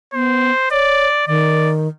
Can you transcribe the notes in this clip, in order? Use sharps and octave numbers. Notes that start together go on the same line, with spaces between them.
B3 C5
C#5 D5
D#3 D5